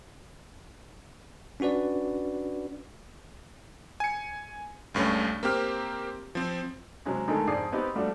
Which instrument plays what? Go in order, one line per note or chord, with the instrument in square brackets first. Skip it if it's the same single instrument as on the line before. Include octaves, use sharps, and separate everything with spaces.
[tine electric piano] C#4 D4 F#4 B4 D5
[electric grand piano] G#5 C#7
C#2 G2 A3 C#4
A#3 C4 G4 F6
F3 C4
[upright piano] C3 F#3 G#3 C#4
D3 D#3 G#3 A3 G#4 A4
F2 G#2 G#4 D5 D#6 C7
B3 C4 D#4 G4 B4
F3 G3 A3 D4 F#4